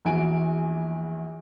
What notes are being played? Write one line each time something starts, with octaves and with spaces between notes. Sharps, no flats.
A#1 E2 E3 F#4 G#5 D7